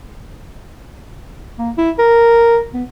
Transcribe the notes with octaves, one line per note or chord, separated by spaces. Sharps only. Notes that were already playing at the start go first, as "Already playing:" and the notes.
A#3
E4
A#4
B3